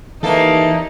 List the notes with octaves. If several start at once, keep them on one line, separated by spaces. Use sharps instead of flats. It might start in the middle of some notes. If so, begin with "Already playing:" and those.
D#2 E3 A3 A#3 D#4 A4